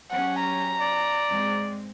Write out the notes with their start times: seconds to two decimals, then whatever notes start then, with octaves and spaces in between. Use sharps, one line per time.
0.11 F#3 C#4 G4 F#5
0.40 A#5
0.80 D5
1.29 G#2 G#3 C4